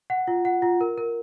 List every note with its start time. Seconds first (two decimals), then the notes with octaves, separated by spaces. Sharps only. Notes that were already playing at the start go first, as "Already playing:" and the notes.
0.10 F#5
0.28 F4
0.45 F#5
0.62 F4
0.81 A#4
0.98 A#4